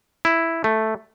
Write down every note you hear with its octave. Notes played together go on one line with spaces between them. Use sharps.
E4
A3